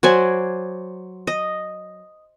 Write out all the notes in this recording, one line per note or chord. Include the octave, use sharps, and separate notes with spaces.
F#3 C5 D5 G#5
D#5